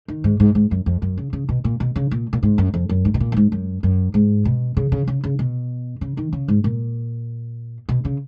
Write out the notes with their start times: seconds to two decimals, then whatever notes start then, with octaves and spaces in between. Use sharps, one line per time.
0.08 D#3
0.24 G#2
0.40 G#2
0.55 G#2
0.71 F#2
0.86 F2
1.02 F#2
1.17 C#3
1.33 C#3
1.49 B2
1.64 A#2
1.80 B2
1.96 C#3
2.11 A#2
2.33 A#2
2.43 G#2
2.58 F#2
2.74 F2
2.89 F#2
3.05 G#2
3.14 B2
3.20 A#2
3.32 F#2
3.37 G#2
3.52 F#2
3.83 F#2
4.14 G#2
4.45 B2
4.77 C#3
4.92 C#3
5.07 C#3
5.24 C#3
5.39 B2
6.01 C#3
6.17 D#3
6.33 C#3
6.48 G#2
6.64 A#2
7.89 B2
8.05 C#3